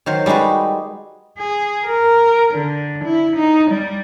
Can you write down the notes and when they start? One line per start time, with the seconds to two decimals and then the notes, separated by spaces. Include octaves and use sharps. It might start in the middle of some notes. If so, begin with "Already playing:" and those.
0.06 D#3 F#3 C5
0.26 G3 G#3 D#4 F#4 B4
1.38 G#4
1.85 A#4
2.54 D3
3.04 E4
3.36 D#4
3.71 G3